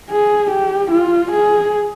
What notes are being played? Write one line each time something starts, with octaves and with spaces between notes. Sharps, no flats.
G#4
G4
F4
G#4